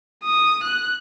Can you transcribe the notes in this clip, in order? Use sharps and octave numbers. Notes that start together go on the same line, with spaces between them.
D#6
F#6